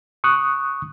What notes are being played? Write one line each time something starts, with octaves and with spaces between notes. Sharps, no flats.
C#6 D#6 F#6